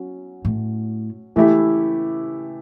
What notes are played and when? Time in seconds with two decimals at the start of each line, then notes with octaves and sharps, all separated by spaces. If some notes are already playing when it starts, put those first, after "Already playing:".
Already playing: F#3 C#4
0.45 A2
1.36 C#3 E3 A3 E4 G4